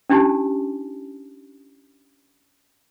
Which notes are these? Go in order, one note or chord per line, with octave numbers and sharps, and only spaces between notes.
C#4 D4 E4 G4 G#5 A5